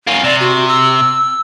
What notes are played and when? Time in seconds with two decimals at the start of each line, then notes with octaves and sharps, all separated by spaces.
0.07 A#3 C#4
0.24 C3 D5
0.40 F#4
0.68 E6